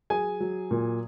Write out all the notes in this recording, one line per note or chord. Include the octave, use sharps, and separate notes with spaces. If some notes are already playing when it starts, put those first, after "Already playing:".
F#3 G#4 G#5
F#3
A#2